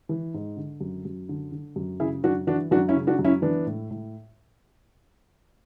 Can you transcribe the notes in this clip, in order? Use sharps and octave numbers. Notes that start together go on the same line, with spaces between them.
E3
G#2
D3
F#2
F#2
D3
D3
F#2
C#3 E4 G#4
F#2 D4 F#4
E3 D4 F#4
F#2 D4 F#4
C#4 E4
C#3
D4 F#4
F#2
C#4 E4
E3 B3 D4
A2
A2